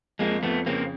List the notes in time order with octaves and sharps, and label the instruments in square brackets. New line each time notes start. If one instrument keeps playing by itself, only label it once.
[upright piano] F2 [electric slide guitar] G#3 A#3
[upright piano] F2 [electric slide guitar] A3 B3
[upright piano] C#3 [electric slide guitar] A#3 C4